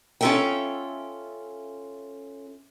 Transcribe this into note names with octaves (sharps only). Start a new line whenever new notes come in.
C#4 F4 F#4 A4 E5 G5